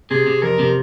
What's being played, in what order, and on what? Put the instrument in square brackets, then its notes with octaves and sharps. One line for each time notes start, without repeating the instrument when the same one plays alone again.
[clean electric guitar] C3 [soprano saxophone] G#4
[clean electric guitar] C3
[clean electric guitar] F2 [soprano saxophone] A#4
[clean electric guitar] C3